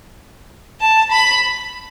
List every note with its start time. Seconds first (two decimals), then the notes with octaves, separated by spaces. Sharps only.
0.80 A5
1.12 B5